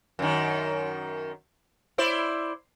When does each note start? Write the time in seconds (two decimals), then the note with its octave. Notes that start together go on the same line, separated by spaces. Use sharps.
0.19 F#2 D#3
1.98 E4 C5 D5